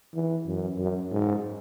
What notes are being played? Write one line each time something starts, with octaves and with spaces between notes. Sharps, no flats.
E3
F#2
F#2
G#2